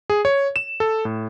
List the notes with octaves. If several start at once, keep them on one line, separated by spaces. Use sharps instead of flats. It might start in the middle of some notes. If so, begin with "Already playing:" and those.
G#4
C#5
E7
A4
A2